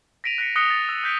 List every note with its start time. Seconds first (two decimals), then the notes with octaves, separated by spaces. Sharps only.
0.24 A#6 B6 D7 D#7 F7
0.38 F#6 A#6 B6 C#7
0.56 D#6 F#6 A#6 B6 C#7 G7
0.70 A6 C#7
0.89 E6
1.04 F#6 G6 B6 C#7 D7